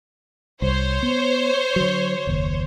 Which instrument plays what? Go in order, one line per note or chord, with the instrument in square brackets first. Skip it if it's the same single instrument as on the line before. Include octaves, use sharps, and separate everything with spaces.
[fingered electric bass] C2 [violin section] C5 C#5
[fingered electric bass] B3
D3 F#3
F#1 D#2